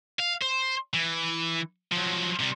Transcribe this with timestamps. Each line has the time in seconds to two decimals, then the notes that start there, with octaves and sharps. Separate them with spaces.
0.19 F5
0.42 C5
0.94 E3
1.92 F3 F#3
2.40 C3 G3